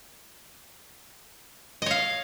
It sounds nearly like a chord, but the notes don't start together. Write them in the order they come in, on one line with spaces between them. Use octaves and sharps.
D#5 C#5 F5